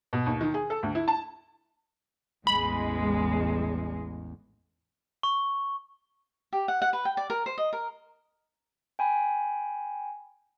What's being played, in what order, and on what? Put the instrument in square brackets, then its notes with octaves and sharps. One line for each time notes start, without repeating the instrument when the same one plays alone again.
[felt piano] B2
D#2
D#3
G#4
A4
D2
E4
A5
[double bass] A1 E2 [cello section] G#3 [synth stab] B5
[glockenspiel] C#6
[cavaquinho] G4
F#5
F#5
B4
G5
D5
A#4
C5
D#5
A#4
[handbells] G5 G#5 B5